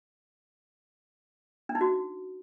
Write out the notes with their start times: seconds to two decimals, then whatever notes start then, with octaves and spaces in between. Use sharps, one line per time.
1.69 D4
1.75 D#4
1.81 F#4